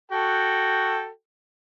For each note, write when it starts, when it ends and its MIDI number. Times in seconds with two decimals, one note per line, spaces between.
0.11 1.08 66
0.11 1.08 69
0.11 1.08 79